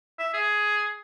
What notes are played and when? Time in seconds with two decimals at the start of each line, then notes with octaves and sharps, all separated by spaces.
0.19 E5
0.34 G#4